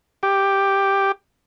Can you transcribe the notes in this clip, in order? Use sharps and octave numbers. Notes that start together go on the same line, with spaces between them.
G4